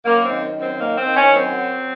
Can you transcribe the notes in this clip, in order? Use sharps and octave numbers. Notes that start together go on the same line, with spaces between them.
F#2 A#3
D#3 C4
F#2
C4
D#3 A#3
C4
D#3
C#4
F#2
C4
F#3